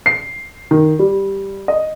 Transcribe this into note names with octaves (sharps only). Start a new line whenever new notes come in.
C7
D#3
G3
D#5